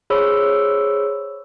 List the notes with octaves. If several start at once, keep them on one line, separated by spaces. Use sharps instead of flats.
G#4 C5 C#5 B5 E6